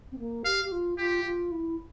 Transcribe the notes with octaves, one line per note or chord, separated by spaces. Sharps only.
C4
A#3
G4 F5
G4
F4
F4 G4
F4
E4